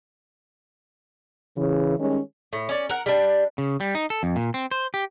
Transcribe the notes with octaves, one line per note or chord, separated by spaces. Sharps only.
C#3 E3
D#3 G3 G#3 C#4
A2
C#4 D5
A#4 F#5
G3 D4
C#3
G3
D#4
A4
F2
A#2
C4
C5
G4